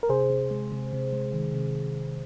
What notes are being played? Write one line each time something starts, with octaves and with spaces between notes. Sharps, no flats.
A#4
C3 G#4 C5
C3
G#3
C3
C3
G#3
D#3
C3